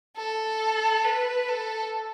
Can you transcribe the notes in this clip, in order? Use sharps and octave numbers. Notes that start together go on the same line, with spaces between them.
A4
B4
A4